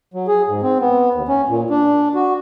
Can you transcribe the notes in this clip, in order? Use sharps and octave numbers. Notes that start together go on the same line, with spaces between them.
F#3
G#4
G#2
C4
B3
D#2
C#4
A#2
D4
F#4